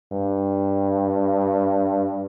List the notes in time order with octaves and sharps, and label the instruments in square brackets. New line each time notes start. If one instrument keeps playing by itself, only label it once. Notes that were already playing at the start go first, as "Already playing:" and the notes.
[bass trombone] G2